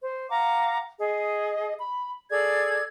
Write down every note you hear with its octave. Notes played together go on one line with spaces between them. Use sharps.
C5
F5 F#5 A#5 D6
G#4 D#5
B5
G#4 A4 D5 G#6